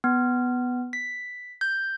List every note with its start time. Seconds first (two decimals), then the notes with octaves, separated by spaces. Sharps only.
0.04 B3
0.93 B6
1.61 G6